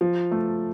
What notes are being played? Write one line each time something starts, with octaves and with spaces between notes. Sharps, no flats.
F3
A3